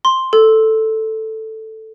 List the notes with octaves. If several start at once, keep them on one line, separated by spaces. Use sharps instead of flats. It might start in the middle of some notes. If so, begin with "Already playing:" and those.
C6
A4